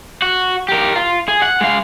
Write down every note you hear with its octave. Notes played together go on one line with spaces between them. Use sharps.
F#4
G4 A#4
F4
G#4
F#5
G#3 F5